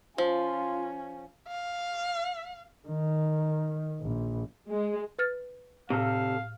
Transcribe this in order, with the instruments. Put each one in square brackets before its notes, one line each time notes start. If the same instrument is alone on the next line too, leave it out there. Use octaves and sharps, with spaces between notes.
[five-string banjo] F3 [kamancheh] C#4 [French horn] F4
[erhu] F5
[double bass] D#3
A#1
[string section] G#3
[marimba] B4 F6 A6
[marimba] A2 [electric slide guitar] C3 A4 [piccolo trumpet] F5